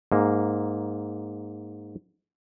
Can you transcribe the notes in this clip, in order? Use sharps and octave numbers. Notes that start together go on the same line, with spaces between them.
G#2 A#3